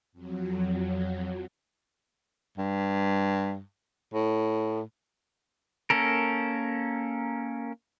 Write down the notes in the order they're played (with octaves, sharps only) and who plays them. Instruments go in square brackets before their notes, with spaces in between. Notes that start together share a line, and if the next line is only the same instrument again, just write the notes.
[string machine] F2 F#3
[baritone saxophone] G2
A2
[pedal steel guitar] A#3 C#4 A4 A#4